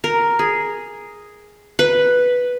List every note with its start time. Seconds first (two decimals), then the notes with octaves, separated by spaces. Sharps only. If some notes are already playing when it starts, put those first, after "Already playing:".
0.04 A#4
0.39 G#4
1.79 B4